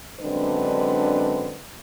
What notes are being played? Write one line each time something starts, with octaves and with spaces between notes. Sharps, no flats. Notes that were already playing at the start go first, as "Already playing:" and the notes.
F#2 D3 G#3 C4 D4 B4